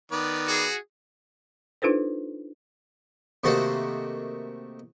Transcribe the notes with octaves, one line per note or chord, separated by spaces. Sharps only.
D#3 B3 D5
F#4 G#4
D4 D#4 F4 A4 B4 C5
C3 D#3 A3 A#3 F#4 C5